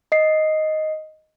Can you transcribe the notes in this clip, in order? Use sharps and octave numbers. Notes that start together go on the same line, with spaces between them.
D#5 C7